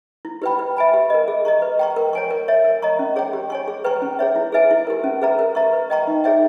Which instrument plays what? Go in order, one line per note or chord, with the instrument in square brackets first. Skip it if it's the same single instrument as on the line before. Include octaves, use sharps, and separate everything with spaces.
[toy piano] E4
G4 B4 G5 B5
B4
E5 G#5 B5
G4
A#4 D#5
G#4
D#5 A#5 C#6
B4
G5 A#5 C#6
A#4
C#5 G#5 C#6
A#4
C#5 E5
A#4
D#5 A#5 C#6
C#4
G#4 C#5 G5
G4
C#5 G#5 C#6
G#4
B4 G5 A#5 C#6
C#4
G#4 C#5 E5
E4
G#4 B4 E5 G#5
E4
G4 A#4
C#4
G#4 B4 E5 A#5
A#4
E5 A#5 C#6
B4
D#5 G5 A#5 C#6
D#4
G#4 C#5 E5 G5